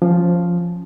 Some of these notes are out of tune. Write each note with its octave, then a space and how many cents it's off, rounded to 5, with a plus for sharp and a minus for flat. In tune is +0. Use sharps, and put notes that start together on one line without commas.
F3 +0 C#4 +0